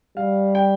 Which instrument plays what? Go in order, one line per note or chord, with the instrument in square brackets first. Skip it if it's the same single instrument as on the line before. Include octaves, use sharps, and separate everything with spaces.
[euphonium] G3 [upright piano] F5
[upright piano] G5